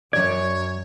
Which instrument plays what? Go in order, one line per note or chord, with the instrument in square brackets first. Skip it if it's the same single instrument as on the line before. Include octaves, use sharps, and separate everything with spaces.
[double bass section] F#2 [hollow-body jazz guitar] F#3 D5 [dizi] C#5 [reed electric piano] G#6